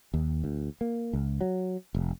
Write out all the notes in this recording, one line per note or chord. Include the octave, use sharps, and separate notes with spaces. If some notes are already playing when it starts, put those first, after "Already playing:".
D#2
D2
A#3
C#2
F#3
F1